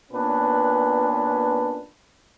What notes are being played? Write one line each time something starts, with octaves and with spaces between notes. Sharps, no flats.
A#2 B3 C#4 D4 B4